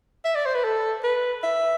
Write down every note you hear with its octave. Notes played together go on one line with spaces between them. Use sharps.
E5
D5
C5
B4
A4
B4
E5